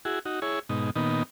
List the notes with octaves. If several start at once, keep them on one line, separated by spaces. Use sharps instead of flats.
E4 F#4 G#4
D#4 F#4
E4 G#4 C#5
G#2 B2 D#4
A#2 D#3 B3 D#4